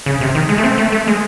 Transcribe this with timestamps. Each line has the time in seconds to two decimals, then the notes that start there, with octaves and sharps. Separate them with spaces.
0.06 C#3
0.21 C3
0.35 D#3
0.49 G#3
0.58 A3
0.64 C4
0.78 A3
0.92 A3
1.07 G#3